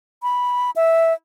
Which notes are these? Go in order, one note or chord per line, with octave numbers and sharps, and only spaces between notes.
B5
E5